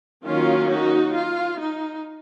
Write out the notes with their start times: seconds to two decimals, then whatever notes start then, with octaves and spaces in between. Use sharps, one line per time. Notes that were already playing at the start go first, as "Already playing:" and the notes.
0.24 D#3 F#3 A#3 C#4 F4
0.69 D#4 F#4
1.14 F4
1.58 D#4